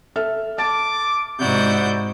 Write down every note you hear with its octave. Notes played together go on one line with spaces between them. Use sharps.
A4 E5 F6
A5 D6 A6
G#2 C3 E4 F#4 D5 F#5 G6